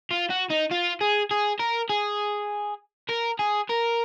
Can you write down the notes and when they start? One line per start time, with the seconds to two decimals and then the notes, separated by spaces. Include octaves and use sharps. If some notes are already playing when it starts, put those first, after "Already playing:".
0.11 F4
0.30 F#4
0.50 D#4
0.71 F4
1.01 G#4
1.31 G#4
1.59 A#4
1.90 G#4
3.09 A#4
3.39 G#4
3.69 A#4